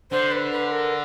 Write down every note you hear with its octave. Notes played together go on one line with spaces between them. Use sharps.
D3 C5
B4
B4
A#4